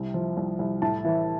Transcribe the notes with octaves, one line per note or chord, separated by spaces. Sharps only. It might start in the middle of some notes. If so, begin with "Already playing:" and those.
Already playing: C2 C3
F3
C2
C2
A2 A5
E3